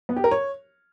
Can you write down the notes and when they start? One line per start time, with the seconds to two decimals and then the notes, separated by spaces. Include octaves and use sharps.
0.09 B3
0.16 G4
0.24 A#4
0.31 C#5